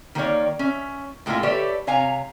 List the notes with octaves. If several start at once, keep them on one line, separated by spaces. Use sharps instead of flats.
D#3 A#3 F#4 B4 C#5 D5
C#4 E5
A2 G#3 A#3 F4 A#4 E5
G4 A4 B4 C#5 D5 E5
C3 C#5 F5 G#5 A#5